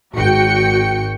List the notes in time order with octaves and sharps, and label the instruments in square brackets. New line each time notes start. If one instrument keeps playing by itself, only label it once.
[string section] G#1 F#4 G5 C#7